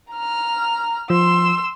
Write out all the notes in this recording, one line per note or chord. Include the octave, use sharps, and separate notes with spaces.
A#5 F6
F3 C6 E6